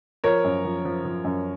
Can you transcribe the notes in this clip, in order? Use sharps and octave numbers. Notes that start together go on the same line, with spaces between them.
F3 A#4 C#5
F#2
F3
F3
F3
F#2